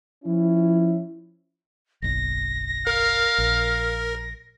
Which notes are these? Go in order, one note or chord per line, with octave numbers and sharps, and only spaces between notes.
F3 C#4 E4
F#1 B1 A#6
A#4 F5
A#1